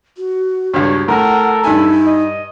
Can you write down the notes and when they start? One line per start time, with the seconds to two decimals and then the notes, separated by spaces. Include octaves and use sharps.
0.18 F#4
0.74 C#2 G2 C#5
1.08 A2 A4 A#4 F#5
1.64 G2 D#4 E4 G#5
2.06 D#5